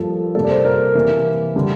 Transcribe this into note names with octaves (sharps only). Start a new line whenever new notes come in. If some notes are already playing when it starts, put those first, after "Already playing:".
Already playing: G2 F3 A#3 A4
C3 G3 A#3 A4
D5
C5
A#4
C3 E3 A#3
D3 G3